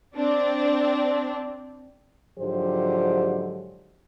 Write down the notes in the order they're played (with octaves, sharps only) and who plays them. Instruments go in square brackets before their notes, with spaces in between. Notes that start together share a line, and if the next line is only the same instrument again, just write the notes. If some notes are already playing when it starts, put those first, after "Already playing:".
[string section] C4 D4
[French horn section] G#2 D3 F3 F#3 G4 C5